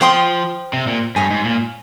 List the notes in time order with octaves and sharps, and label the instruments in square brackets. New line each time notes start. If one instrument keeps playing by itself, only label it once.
[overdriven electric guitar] F3 [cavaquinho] C5 G5 C6 D#6
[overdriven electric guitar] C3
A#2
[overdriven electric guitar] G2 [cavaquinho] C#5 G#5 D#6
[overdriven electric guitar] G#2
A#2